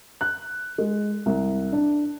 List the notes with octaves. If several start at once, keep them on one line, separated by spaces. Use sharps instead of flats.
F#6
G#3
C2
D4